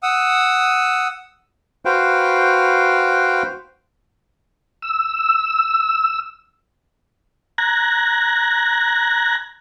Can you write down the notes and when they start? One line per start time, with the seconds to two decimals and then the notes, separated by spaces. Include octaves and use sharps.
0.03 F#5 D#6 E6
1.85 F#4 B4 C5 F5 G5
4.82 E6
7.58 A#5 F#6 G#6 A#6